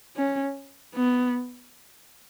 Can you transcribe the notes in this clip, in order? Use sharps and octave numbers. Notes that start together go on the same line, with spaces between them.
C#4
B3